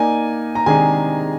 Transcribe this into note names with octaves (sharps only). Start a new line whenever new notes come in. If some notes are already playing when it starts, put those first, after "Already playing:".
Already playing: A#3 D#4 A#4 D5 G#5
A#5
C3 D#3 G#3 D4 G#4 G#5